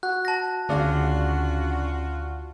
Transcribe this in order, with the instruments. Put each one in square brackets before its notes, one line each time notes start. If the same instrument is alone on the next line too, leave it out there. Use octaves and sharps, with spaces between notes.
[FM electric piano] F#4 [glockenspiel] F#6
[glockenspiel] A5 A#6
[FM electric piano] D2 D5 [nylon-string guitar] C#3 D4 F5 [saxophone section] F4 F#4